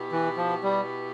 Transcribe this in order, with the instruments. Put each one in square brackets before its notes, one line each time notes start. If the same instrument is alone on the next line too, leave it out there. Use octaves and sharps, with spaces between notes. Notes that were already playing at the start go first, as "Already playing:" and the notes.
Already playing: [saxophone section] B2 B3 E4 G4
[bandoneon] E3
F3
G3